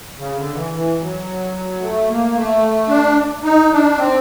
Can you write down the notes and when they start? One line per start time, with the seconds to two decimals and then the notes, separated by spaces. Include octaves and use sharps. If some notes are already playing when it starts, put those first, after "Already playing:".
0.18 C#3
0.37 D3
0.55 E3
0.73 E3
1.00 F#3
1.81 A3
2.09 A#3
2.35 A3
2.89 D4
3.44 D#4
3.71 D4
3.98 C4